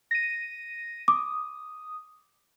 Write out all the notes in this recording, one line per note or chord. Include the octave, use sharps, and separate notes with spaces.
A#6 D#7
D6 D#6